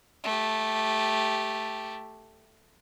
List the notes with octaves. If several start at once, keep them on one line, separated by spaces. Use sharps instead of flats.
A3 G4